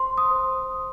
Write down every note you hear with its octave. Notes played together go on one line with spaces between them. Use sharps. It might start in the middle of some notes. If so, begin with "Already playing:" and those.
Already playing: C5 C6
D#6
C5